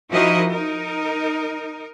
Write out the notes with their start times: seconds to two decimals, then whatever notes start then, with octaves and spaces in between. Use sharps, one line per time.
0.12 F3 D#4 E4 F#4 A#4 D#5
0.49 D#4 A#4